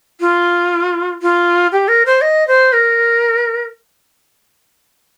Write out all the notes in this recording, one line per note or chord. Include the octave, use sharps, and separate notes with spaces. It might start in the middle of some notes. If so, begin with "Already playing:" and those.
F4
F4
G4
A#4
C5
D#5
C5
A#4